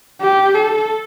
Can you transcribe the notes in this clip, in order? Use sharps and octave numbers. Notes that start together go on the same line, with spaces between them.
G4
A4